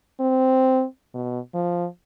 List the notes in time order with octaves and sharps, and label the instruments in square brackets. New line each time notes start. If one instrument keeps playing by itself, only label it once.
[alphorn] C4
B2
F3